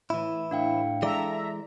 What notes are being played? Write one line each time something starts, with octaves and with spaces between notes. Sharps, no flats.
A2 E3 E4
A2 D4 F5 G5
E3 G#3 A4 D5 E5 A#5